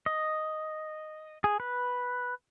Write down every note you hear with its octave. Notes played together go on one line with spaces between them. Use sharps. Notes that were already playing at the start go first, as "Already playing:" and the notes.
D#5
G#4
B4